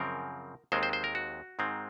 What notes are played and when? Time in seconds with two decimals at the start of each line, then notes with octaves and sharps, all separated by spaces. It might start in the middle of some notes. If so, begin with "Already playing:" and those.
Already playing: F#2 C#3 F3 C4 A#4
0.72 D#2 D#3 G#3 C4 C5
0.83 C5
0.93 C5
1.04 A#4
1.15 F#4
1.59 G#2 D#3 G#3 C4